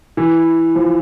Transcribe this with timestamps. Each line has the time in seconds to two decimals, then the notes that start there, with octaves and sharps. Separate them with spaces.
0.17 E3
0.75 F3